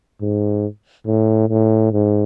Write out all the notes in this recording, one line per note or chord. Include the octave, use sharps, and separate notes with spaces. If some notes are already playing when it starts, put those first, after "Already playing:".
G#2
A2
A2
G#2